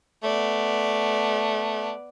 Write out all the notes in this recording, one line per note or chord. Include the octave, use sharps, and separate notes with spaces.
A3 B3 D5